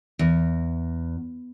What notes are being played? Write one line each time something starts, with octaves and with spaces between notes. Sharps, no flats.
E2